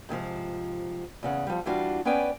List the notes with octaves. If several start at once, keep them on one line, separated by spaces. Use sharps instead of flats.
G#2 C3 D#3 F3
E2 C#3 F#5
F3 G3
E3 G3 D4 F4 F#4
B3 C#4 B4 D5 G5 G#5